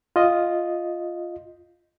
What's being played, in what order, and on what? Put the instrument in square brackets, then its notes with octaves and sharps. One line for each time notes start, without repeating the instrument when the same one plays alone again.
[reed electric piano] F4 D#5